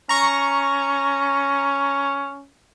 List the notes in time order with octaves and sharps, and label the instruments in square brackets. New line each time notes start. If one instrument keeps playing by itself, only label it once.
[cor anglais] C#4 [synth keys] A#5 C#6